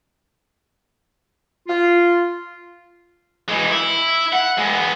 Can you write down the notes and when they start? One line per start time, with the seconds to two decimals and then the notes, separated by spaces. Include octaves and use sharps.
1.68 F4
3.49 E3 G#3
3.71 E4
4.33 F#5
4.59 G#3 B3